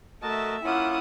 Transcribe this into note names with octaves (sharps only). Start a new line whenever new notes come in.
A3 F#4 A#4 D#5 E5 A5
A#3 C#4 E4 F4 F#5 D#6